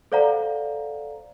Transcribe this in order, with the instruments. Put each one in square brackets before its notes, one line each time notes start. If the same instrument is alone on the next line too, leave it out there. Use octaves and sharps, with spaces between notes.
[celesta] A4 C5 D5 F5 F#5 A#5